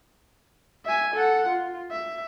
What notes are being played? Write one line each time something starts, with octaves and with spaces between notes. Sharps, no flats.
E5 G#5
A4 F#5
F4
E5